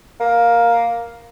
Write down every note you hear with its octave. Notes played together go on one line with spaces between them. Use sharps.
A#3